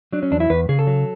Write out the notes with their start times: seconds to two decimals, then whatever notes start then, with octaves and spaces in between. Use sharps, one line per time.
0.13 F#3 D4
0.23 C#4
0.31 E2 D4
0.40 E4
0.50 E2 B4
0.69 C#3 G#4
0.79 A4
0.87 F#3